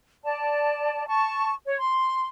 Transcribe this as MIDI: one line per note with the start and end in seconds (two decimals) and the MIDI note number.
0.24 1.05 74
0.24 1.05 81
1.07 1.54 81
1.07 1.54 85
1.66 1.76 73
1.78 2.26 84